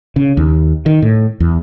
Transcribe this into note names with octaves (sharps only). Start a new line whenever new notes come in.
C#3
D#2
D#3
A2
E2